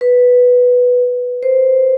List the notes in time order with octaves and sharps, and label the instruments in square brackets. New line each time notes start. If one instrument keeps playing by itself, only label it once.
[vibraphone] B4
C5